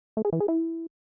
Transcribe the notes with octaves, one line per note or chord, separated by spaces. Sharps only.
A3
G#4
E3
G#4
E4